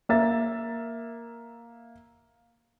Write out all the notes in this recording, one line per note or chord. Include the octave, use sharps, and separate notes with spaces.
A#3 E5 A6